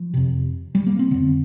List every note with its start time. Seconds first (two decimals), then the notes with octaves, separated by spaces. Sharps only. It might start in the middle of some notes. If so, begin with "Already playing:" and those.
Already playing: F3
0.14 F2 C3
0.75 G3
0.87 A#3
0.99 C4
1.11 F2 D3